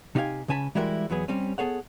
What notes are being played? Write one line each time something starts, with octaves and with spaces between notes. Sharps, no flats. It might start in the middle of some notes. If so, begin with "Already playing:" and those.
C3 D#4 G4 D5 F5 G#5
C#2 C#3 C#4 G#5 A5 B5
E3 G3 G#3 E4 F#4 A#4
E2 F#3 B3 G#4
G3 C4 C#4
B3 G#4 A4 C#5 F#5